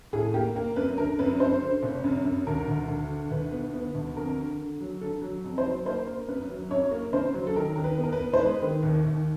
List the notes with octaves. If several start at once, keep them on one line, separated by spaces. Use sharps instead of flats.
A2 G#4
A#3 G4
A#3
F#2 B4
D3 A#4
F#2 B4
F#2 C5
D3
F#1
F#2
F#2
D2 A#4
D2
D2
D3
D2 B4
B3
B3
D2
F2 A#4
D3
D3
F#3
D3 A4
F#3
F2
C5
F#3
A#3 C5
A#3
F#2 B4
F#3
F#2 C#5
A#3
C#3 C5
F#3
A4
D#3 A#4
D#3 A#4
B4
B3
A#4
B4
B3
C5
G#3 B4
D#3
D#2
D#2